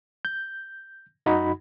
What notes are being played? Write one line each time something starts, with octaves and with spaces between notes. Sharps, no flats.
G6
F#2 D#4 F#4 B5